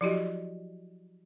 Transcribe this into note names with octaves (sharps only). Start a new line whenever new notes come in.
F3 F#3 E4 F#4 G4 D#5